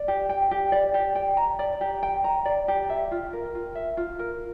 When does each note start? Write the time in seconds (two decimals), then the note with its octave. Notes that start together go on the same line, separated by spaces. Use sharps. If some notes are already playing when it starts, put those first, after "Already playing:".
Already playing: D5
0.08 G4
0.29 G5
0.51 G4
0.72 D5
0.94 G4
1.15 G5
1.37 A#5
1.59 D5
1.81 G4
2.03 G5
2.24 A#5
2.45 D5
2.68 G4
2.89 E5
3.11 F4
3.33 A#4
3.55 F4
3.75 E5
3.97 F4
4.19 A#4